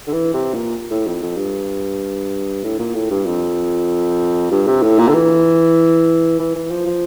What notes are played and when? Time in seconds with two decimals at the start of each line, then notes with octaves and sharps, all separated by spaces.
0.07 D3
0.13 E3
0.33 C3
0.54 A#2
0.90 A2
1.07 F2
1.22 F2
1.37 G2
2.64 A2
2.79 A#2
2.94 A2
3.10 G2
3.26 F2
4.51 G2
4.67 C3
4.83 A2
4.98 A#2
5.08 D3
5.14 E3
6.39 E3
6.55 E3
6.71 F3
6.86 F3